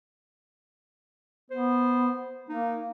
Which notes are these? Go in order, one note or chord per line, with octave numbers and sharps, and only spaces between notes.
B3 C5
A#3 D#4